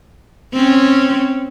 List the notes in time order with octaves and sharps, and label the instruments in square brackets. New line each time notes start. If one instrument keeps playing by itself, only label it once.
[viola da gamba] C4 C#4